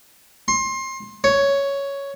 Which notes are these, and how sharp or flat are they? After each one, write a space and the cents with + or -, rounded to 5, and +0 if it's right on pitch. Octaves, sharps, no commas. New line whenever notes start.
C6 +25
C#5 +5